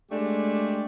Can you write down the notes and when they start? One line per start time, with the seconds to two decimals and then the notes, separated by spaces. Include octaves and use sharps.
0.10 G#3 A3 D4 G4